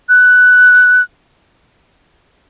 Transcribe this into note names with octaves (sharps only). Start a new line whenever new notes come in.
F#6